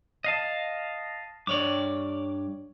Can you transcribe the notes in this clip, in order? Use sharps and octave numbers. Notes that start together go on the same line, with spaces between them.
D#5 F5 A5
G2 C#5 D5 D6